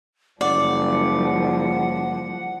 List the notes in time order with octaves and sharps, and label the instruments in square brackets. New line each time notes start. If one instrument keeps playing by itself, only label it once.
[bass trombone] F#1 [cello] F3 G3 [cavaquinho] D5 [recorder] F#5